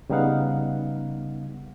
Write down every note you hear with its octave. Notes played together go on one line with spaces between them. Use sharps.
C#3 G3 B3 D#4 F5 F#5